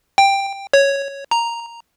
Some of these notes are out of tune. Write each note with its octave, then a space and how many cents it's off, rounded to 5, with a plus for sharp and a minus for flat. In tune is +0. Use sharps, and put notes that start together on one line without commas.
G5 +10
C#5 +0
A#5 +0